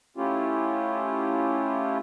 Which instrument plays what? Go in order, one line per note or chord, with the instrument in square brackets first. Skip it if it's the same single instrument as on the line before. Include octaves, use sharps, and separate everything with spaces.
[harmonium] A3 C#4 E4 F4 G4